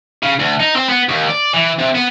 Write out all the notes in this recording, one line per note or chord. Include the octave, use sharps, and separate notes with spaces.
C#3
D2
D#4
C4
B3
D#2
D5
E3
C3
B3